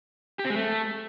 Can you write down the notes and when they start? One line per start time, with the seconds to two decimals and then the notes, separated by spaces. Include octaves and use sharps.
0.39 G4
0.45 C4
0.50 G#3
0.56 A3